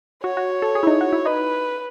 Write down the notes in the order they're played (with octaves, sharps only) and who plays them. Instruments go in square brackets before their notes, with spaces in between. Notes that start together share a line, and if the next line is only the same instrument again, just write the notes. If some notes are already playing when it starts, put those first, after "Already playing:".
[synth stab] F#4 [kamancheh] C#5
[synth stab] F#4
A4
G#4
E4
D#4
F#4
E4
[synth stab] D#4 [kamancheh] B4